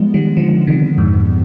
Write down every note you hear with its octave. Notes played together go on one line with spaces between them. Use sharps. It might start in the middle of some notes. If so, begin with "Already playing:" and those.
Already playing: F3 G3 G#3 B3
D#3 G3
D3 F3
C3 D#3
F2 G#2